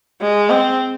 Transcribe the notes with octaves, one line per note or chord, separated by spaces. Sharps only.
G#3
C4